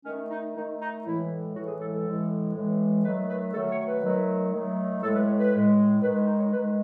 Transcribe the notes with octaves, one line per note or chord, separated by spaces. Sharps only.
D#3 A3 C#4
D#4
D#3 A3 D#4
D#4
A2 E3 G#3 E4
A2 E3 G#3 F#4
G#4
A4
A4
A2 E3 G#3
A2 E3 G#3
D#3 F#3 A3 B4
B4
D#3 F#3 A3 A4
C#5
B4
D#3 F#3 A3
D#3 F#3 A3
A2 G#3 A4
B4
C#5
B4
A2 G#3
D#3 G#3 B4
B4
D#4
C#5
D#3 G#3 B4